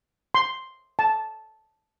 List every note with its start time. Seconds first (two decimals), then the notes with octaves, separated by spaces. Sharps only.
0.35 C6
0.99 A5